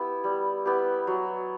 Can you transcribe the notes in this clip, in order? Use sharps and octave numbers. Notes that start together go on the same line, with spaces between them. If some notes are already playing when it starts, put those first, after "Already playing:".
Already playing: B3 E4 G4
G3
B3 E4 G4
F#3